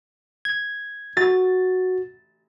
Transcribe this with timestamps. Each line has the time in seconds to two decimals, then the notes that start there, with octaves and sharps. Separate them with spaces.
0.45 G#6
1.17 F#4 A6